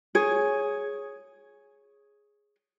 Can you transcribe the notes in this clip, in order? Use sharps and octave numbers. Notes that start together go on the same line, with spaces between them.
G#4 C#5